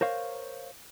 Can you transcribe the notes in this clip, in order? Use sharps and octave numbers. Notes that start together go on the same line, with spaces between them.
A#4 C5 C#5 F5